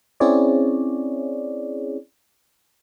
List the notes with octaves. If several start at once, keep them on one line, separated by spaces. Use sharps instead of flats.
C4 C#4 E4 G#4 C#5 D5